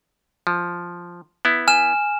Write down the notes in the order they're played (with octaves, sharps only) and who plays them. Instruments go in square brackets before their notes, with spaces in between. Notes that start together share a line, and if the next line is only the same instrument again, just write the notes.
[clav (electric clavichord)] F3
B3 E4
[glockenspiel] G#5 F6 E7